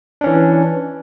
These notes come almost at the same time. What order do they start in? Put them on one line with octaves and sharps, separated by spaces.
D4 C#4 E3